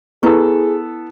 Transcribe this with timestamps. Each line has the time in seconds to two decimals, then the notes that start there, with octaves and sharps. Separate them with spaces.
0.23 B3 E4 G#4 A4 B4 C#6